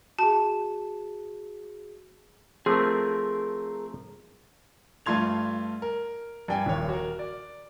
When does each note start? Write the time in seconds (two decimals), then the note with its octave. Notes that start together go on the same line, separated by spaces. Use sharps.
0.19 F#4 G#4 A5
2.66 F3 A3 C4 G#4 A#4
5.06 G2 A3 F4 C6 G#6 F7
5.82 A#4
6.48 G2 G4 G5 G#5
6.66 D#1 D#2 C#5
6.89 F#4 A#4
7.19 D5